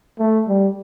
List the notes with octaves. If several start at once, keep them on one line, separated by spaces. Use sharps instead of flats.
A3
G3